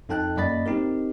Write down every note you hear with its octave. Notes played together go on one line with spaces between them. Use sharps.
F2 D#4 A4 G5 A5 F#6
F#2 A#3 D5 D#5 B5 A6
C4 D#4 G4 A#4